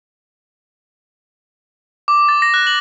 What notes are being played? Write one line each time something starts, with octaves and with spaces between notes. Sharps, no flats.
D6
A6
A#6
F#6
F#7